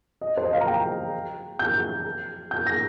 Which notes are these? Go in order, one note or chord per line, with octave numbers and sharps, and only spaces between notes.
D#5
C5
D#5
F5
A#5
G5
G6
G6
A#6